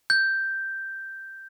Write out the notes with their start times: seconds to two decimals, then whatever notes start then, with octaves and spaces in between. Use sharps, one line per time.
0.10 G6